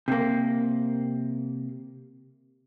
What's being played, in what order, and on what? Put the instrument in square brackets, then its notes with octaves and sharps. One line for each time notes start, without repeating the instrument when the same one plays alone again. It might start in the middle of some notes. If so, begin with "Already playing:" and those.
[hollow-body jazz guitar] C3 A#3